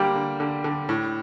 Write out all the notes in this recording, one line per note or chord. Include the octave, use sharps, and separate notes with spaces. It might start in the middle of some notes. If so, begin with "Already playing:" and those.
Already playing: D3 G3 A#3 G4
D3
D3
D3
A2